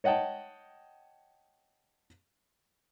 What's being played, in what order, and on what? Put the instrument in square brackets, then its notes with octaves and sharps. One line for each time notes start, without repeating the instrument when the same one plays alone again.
[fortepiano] C#5 D#5 F#5 G5 A5